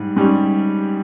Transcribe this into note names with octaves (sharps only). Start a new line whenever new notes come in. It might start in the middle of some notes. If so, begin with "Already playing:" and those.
Already playing: G#2 G3
G#2 G3 C#4